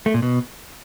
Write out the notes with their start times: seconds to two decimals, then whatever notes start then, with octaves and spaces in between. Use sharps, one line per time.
0.06 A3
0.14 A#2
0.22 B2